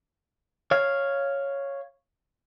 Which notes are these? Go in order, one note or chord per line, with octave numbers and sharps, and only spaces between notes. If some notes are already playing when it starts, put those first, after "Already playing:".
C#5 F5